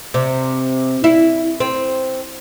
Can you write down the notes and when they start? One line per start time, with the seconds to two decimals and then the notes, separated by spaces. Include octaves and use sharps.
0.14 C3
1.04 E4
1.60 C4